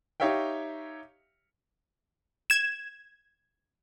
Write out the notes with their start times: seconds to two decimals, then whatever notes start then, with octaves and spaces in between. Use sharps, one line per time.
0.20 D#4 G4 C#5 E5 F5 G5
2.50 G#6 E7